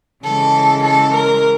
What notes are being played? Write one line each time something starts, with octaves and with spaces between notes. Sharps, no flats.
C#3 E3 G#3 A4
A4
A#4